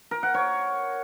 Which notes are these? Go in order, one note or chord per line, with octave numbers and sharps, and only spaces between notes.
A#4
F#5
C#5